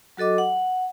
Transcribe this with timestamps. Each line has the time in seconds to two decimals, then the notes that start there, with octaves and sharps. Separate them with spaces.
0.17 F#3 F#4 A4 D#5 D6
0.38 F#5